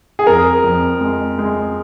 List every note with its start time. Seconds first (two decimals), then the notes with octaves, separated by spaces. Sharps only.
0.19 G#4
0.27 F2 A#4
0.64 F2
1.01 G#3
1.39 G#3